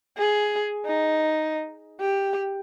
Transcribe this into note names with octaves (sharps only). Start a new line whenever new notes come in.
G#4
D#4
G4